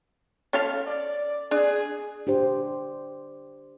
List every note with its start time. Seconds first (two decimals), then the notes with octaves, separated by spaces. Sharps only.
0.53 C#4 A4 F5
0.87 D5
1.51 D4 G#4
2.27 D4 G4 C5